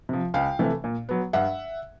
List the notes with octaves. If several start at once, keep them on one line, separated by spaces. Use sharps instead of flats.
C3 F3
C#2 F5 G5
C3 E3 A3
A#2
F#3 B3
G2 E5 F#5